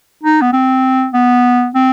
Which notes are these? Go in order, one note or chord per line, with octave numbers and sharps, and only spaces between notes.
D#4
B3
C4
B3
C4